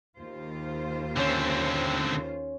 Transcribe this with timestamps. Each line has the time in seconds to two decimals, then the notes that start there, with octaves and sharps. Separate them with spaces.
0.18 D#2 F4 C5
1.17 D3 C4 C#4